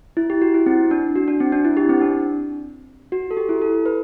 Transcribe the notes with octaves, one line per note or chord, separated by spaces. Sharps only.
E4
G4
F#4
E4
C4
D4
F#4
D4
C4
D4
E4
G4
C4
D4
F#4
A4
G4
E4
A4
B4